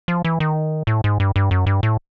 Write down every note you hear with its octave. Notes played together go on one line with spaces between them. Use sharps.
F3
E3
D#3
A2
G#2
G2
G2
F#2
G2
A2